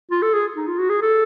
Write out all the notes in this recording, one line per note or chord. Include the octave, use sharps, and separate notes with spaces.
F4
A4
G#4
D#4
F4
F#4
G#4
A4